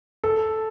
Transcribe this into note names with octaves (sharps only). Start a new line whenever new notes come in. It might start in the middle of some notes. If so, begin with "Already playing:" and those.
A4